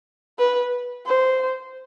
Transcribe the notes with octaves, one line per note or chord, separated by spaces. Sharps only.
B4
C5